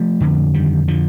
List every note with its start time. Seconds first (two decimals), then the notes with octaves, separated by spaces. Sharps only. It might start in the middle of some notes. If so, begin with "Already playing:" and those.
Already playing: F3 A3
0.21 F2 D3
0.54 D#3 G3
0.88 D3 F3